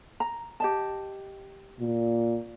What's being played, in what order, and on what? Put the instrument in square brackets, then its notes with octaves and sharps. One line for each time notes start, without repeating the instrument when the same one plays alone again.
[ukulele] A#5
G4 D#5 A5
[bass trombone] A#2